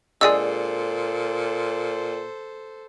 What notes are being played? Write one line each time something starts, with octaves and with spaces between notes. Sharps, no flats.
A#2 D3 G#3 G#4 A4 C5 D5 E6